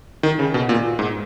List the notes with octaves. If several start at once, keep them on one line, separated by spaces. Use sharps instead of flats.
D#3
C#3
B2
A#2
G#2